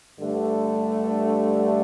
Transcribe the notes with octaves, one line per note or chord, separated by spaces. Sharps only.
G2 D3 A3